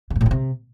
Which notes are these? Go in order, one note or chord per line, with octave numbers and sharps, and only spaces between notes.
C#3
G#2
A2
C#3
C3